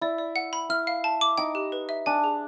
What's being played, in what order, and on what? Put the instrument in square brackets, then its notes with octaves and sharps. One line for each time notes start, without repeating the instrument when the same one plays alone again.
[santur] E4 [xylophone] D5
[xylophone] D5
F#5
B5
[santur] E4 [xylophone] F6
[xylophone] F5
A5
D6
[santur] D#4 [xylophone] G5
[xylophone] G4
B4
E5
[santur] D4 [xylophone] G#5
[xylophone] G#4